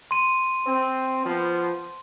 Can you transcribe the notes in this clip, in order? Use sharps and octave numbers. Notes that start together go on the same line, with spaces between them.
C6 D#7
C4
F3 B3